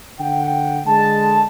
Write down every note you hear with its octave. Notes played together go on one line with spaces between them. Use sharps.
D3 F#5 G5
D3 G#3 A5